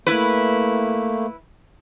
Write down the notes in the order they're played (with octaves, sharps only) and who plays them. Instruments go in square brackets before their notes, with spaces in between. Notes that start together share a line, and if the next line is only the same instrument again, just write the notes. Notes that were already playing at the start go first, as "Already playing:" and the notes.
[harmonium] A3 A#3 [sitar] E4 B4